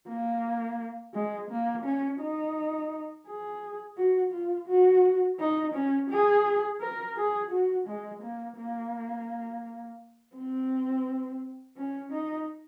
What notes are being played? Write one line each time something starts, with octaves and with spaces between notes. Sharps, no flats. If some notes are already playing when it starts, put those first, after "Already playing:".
A#3
G#3
A#3
C#4
D#4
G#4
F#4
F4
F#4
D#4
C#4
G#4
A#4
G#4
F#4
G#3
A#3
A#3
C4
C#4
D#4